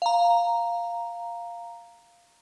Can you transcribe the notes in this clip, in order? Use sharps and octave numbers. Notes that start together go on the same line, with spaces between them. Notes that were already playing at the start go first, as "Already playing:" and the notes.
F5 A#5